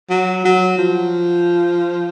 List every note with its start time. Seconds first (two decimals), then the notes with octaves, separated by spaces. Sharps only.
0.10 F#3
0.45 F#3
0.78 F3